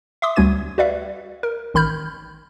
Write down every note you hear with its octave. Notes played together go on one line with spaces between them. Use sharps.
E5 C6 D6 D#6
D2 G3 C#4 F#4 G#6 D#7
F#4 B4 D5 E5 F5
A#4
A1 D#3 B5 F6 G6